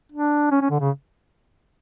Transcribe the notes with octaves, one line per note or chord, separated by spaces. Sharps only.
D4
C#4
C#4
D3
C#3